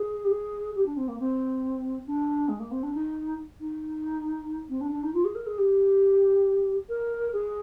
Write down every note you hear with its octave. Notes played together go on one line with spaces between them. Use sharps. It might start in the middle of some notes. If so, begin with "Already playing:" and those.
Already playing: G#4
G4
G#4
G4
D4
C4
A#3
C4
D4
G#3
A#3
C4
D4
D#4
D#4
C4
D4
D4
D#4
F4
G#4
A#4
G#4
G4
A#4
G#4